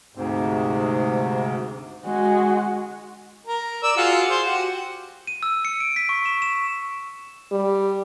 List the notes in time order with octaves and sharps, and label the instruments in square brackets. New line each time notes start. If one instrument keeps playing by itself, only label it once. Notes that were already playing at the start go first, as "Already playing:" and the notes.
[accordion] D2 G#2 C3
[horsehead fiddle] G#3 F#4
[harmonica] A#4
D5 E6
F4 F#4 G#4
C5
F#4 G4
[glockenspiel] D#7
E6
C#7
D7
B6
C#6
E7
E7
[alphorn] G3